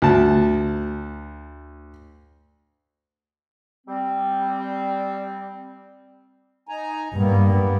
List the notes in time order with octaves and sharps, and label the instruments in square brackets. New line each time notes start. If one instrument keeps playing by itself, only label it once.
[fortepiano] D2 A5
[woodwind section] G3 C4
[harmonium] D#4 G#5 A#5
[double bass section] G2 [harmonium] G3 A#3 B3